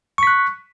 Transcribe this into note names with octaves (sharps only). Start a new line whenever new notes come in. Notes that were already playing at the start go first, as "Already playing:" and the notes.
C#6 F#6 B6